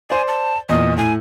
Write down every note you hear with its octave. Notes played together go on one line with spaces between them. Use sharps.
C5 D5 G#5
A5
E2 A#2 D#5
A2 G#5